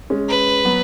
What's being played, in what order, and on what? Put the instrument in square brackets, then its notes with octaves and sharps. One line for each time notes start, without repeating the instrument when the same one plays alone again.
[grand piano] G#3 C#4
[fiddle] B4
[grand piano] F#3 B3